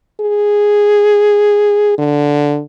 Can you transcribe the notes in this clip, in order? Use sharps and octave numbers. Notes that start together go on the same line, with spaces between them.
G#4
D3